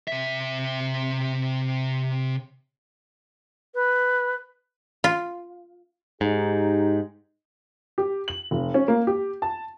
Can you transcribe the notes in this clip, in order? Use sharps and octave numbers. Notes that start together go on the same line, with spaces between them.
C3 E5
B4
F4
G#2 D#4 G4
G4
F#7
F1
C#4
A#3
G4
A5